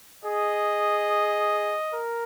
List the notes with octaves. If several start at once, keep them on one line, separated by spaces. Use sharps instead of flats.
G#4 D#5
A#4